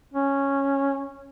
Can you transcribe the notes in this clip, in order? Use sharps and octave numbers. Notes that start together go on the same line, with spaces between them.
C#4